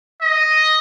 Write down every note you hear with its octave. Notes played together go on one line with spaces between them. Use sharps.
D#5